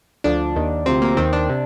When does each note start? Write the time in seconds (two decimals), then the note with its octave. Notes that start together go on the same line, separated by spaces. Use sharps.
0.24 D2 D3 F3 D4
0.56 D#2 D#3
0.86 D2 C3 F3 C4
1.02 A#3
1.17 D#2 D#3 C4
1.33 D4
1.49 C3